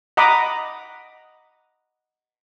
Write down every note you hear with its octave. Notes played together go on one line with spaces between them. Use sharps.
D#5 F#5 A#5 B5 D6 D#6